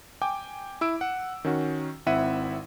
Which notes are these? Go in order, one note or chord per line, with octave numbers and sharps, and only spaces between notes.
G5 G#5 D6
E4 E6 D7
F#5
D#3 C#4 F#4
G#1 C4 E4 E5 F#5 D#7